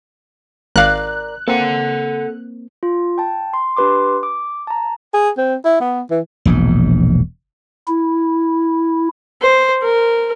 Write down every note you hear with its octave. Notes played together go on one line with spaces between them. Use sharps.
G#1 A#4 D5 F5 A#5 F#6
A#3 C4 A4 F#5
F4
G5 A5
C6
D4 G4 B4 C6 D6
D6
A5 A#5
G#4
C4
E4
B3
E3
E1 A#1 G#2
E4
C5
A#4